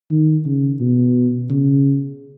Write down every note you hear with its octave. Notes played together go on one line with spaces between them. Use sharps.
D#3
C#3
B2
C#3